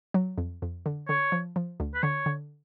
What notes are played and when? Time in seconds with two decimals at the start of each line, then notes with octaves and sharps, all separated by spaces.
0.14 F#3
0.38 F2
0.62 F2
0.86 D3
1.08 D3 C#5
1.32 F3
1.56 F3
1.80 D2
1.95 B4
2.03 D3 C#5
2.26 D3